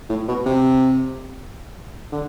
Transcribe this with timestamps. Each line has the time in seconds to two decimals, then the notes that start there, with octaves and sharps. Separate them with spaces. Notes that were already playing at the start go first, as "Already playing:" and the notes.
0.09 A2
0.28 B2
0.46 C3
2.12 D3